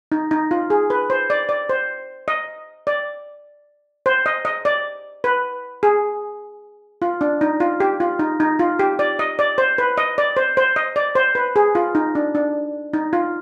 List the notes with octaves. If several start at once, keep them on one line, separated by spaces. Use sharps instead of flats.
D#4
D#4
F4
G#4
B4
C5
D5
D5
C5
D#5
D5
C5
D#5
D#5
D5
B4
G#4
F4
D4
D#4
F4
G4
F4
D#4
D#4
F4
G4
D5
D#5
D5
C5
B4
D#5
D5
C5
C5
D#5
D5
C5
B4
G#4
F4
D#4
D4
D4
D#4
F4